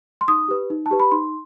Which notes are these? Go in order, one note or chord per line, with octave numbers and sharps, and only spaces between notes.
C6
D#4 D#6
G4 B4
D#4
A5
G4 B4
B5
D#4 C6